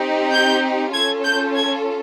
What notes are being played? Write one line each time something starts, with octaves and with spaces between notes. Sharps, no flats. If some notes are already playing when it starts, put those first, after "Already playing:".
Already playing: C4 D#4 G4
G6
C#4 F4 A4 G#6
G6
G#6